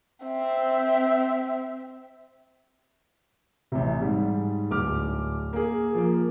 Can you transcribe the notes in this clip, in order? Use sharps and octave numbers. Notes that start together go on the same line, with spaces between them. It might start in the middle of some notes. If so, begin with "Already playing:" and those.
C4 E5
A1 C3
G#2 G3
D1 D6 F6
A#3 G#4
F3 A#3